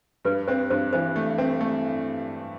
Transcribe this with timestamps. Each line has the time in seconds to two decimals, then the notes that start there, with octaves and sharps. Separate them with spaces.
0.25 G2 B4
0.48 C4 C5
0.70 G2 C5
0.93 E3 C5
1.16 A3
1.38 C4
1.61 A3